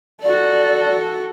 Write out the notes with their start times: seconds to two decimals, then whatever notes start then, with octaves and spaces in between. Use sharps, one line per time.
0.23 F#4 A4 D5